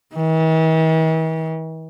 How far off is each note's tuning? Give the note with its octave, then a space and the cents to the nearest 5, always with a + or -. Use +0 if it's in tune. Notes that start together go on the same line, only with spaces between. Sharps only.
E3 -45